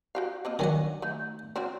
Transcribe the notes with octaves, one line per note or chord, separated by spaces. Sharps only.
F#4 G4 F5
A#3 C4 D#5
D3 D#3 F#3 C#5 F#5 G#5
A3 D#4
C4 C#4 F#4